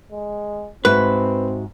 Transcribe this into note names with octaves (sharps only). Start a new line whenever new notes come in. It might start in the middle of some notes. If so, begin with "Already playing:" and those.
G#3
G#2 C4 F#4 B4 E5